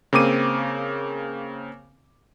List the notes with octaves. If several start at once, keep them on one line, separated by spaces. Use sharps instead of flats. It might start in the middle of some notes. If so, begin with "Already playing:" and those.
C#3 A#3 C4 D6 D#7